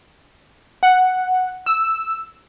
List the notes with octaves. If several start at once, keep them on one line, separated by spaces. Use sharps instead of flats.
F#5
E6